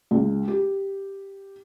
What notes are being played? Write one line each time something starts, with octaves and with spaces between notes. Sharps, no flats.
C#2
G4